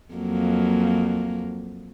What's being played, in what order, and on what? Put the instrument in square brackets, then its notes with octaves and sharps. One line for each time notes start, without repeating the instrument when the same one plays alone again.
[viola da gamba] F2 F#3 A#3